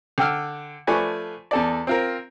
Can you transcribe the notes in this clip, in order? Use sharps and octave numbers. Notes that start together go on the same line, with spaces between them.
D3 G5 E6 F6
F3 A3 B4 D5 G#5 C#6
E2 A4 D5
C4 F4 A#4